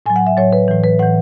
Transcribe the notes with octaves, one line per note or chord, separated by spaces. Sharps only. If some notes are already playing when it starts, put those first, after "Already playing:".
A2 F#3 G#5
F#5
E5
A2 F#3 C#5
B4
A2 E3
B4
A2 E3 F#5